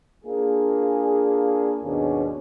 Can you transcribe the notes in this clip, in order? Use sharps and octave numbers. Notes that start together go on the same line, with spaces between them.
A#3 D4 F4 G#4
D#2 G#2 B2 G#3 C#4 D4